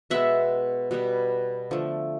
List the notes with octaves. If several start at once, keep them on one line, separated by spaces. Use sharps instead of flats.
B2 G#3 B3 E5 F#5
B2 G3 B3
D3 F3 A3